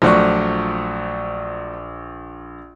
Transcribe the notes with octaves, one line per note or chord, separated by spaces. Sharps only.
A#1 F3 F#3 A3 D5 C#6